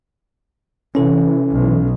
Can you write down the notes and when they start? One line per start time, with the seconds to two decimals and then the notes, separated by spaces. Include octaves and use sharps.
0.95 C3 E3 C#4 A4
1.51 B1